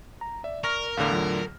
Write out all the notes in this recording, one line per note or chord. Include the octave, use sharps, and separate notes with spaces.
A#5
D5 E5
A#4 C#6 F6 A#6
E2 A2 D3 F5 D6
F#3 F4